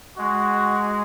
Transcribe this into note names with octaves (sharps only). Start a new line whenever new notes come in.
G#3 F#4